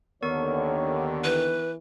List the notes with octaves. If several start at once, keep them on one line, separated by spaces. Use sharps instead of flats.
D#2 D3 D#3 B3 A#4 C#5 C#6
E3 B4